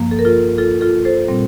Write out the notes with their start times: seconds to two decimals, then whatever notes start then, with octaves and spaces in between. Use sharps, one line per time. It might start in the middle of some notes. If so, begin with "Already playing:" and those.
Already playing: G2 F3 A#3
0.11 A4
0.19 A#4
0.25 F4 A4
0.58 F4 A4
0.81 F4 A4
1.05 A4 C5
1.28 A#2 G3 C4